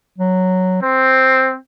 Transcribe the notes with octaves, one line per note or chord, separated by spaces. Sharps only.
F#3
C4 C5